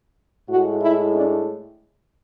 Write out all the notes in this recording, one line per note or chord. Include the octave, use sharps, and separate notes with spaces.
A2 G#3 F#4
E4
D4